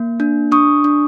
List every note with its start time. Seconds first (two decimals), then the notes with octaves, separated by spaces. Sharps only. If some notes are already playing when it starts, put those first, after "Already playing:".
Already playing: A#3
0.20 D4
0.52 D4 C#6 D#6
0.84 D4